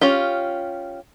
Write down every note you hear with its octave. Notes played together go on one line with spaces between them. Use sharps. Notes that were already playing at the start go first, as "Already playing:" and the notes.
C#4 F4 G4